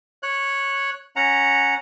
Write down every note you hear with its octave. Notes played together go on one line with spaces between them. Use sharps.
C#5 F#6
C#4 F#5 A#5